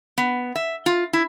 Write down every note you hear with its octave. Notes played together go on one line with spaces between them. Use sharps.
B3
E5
F4
E4